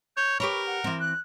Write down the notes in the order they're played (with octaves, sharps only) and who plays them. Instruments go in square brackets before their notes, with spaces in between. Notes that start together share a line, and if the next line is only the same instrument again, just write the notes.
[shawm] C#5 [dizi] G6
[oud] G4 B4 C#5 [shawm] A#4 [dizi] B5
[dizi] F#5
[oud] E3 C4
[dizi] F#6